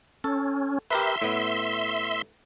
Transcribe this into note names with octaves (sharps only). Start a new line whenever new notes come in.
C#4 A4
G4 A#4 B4 E5 C6
A2 B3